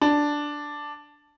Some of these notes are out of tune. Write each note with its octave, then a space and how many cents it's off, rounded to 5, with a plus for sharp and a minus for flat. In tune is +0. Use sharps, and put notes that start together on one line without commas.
D4 +0